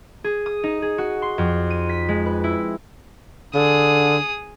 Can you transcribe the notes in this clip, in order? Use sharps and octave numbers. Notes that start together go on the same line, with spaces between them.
G#4
D#6
D#4
G#4
F#4
C6
F2
D#7
B6
G#3
B4
E4
D3 G#4 D#6